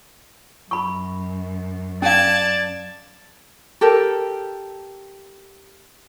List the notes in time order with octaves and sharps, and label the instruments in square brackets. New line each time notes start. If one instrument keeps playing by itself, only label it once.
[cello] F#2 [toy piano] B5 C#6
[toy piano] C#4 F5 [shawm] D5 [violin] A5 G#6
[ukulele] G4 A4 A#4